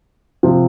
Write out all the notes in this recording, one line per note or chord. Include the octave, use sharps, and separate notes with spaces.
C3 F3